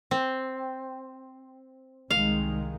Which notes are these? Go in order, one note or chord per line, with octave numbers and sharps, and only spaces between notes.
C4
C2 D#3 G#3 F5